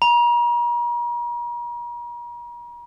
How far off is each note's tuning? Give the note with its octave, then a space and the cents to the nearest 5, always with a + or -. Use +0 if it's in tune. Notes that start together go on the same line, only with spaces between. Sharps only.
A#5 +40